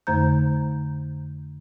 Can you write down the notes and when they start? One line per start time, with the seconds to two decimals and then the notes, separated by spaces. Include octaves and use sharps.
0.07 F2 D3 A3 C5 A#5 G6